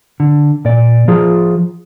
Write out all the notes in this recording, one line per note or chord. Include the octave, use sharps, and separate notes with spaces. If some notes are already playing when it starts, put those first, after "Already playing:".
D3
A#2 D5
F3 F4 G#4